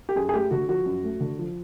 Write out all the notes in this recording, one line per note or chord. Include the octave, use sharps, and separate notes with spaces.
G4
F#2 G#4
G#4
A3 G4
D3 F#4
F3 F#4
F#2
A3
D3
F3